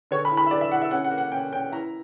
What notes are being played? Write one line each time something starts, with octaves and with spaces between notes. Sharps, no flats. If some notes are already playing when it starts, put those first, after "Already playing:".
D3 C#5
B5
E4
B5
E5
D3 D5
E5
E4 F#5
E5
C#4 F#5
F#5
A#3
F#5
C#4 G5
C#4 G5
E4 A#5